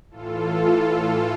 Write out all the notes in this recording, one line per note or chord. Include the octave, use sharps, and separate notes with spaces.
A2 E3 F4 A4